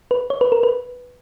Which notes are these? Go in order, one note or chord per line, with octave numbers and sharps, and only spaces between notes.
B4
C#5
B4
A#4
B4